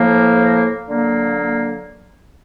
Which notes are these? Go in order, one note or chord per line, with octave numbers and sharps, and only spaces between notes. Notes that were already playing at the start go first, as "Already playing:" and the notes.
Already playing: A2 F3 A#3
D3 F#3 A#3